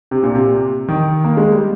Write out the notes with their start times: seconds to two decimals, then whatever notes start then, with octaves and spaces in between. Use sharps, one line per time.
0.11 C3
0.23 A#2
0.35 C3
0.88 D#3
1.24 A#3
1.37 G#3
1.52 G3